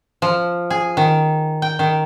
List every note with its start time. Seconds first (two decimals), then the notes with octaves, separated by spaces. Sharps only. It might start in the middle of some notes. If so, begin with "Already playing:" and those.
0.22 F3
0.70 G#4
0.97 D#3
1.62 G5
1.79 D#3